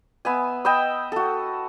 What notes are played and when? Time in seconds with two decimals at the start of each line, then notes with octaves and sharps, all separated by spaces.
0.25 B3 E5 G#5
0.65 D#5 G5 B5 E6
1.12 F#4 A4